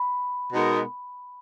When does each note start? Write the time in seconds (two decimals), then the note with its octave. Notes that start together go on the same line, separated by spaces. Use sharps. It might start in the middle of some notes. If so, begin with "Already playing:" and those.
Already playing: B5
0.53 B2 G#3 B3 D#4 A#4